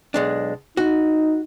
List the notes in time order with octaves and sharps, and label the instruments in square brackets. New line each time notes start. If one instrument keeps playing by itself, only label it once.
[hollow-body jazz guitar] B1 G#3 D4
[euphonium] D#4 [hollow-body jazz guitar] F#4